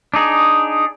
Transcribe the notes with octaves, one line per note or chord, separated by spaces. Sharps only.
D4 D#4 G#4